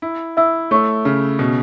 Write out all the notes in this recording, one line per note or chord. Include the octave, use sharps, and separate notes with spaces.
E4
E4 E5 E6
A3 C#5 C#6
C#3
B2